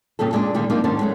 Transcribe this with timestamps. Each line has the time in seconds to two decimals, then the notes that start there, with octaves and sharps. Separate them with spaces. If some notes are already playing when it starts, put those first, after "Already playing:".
0.19 F2 A#2 C#3 G3 A4
0.33 A#2 G#3 C#4 D4
0.54 D3 D#3 G3 G#3 A#3
0.70 F3 G3 A#3 C4 D#4 F4
0.84 G#2 D#3 C#4 D4 C5 A5
1.00 F#3 G#3 A3